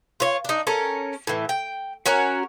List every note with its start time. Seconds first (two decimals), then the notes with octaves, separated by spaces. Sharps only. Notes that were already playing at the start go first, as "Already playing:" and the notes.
0.20 F4 C#5
0.45 D4 D#4
0.67 C#4 A4 A#4
1.27 A2 E3
1.49 G5
2.06 C#4 F#4 A#4 C#5